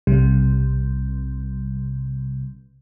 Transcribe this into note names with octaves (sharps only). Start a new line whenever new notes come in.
B1 C3 G3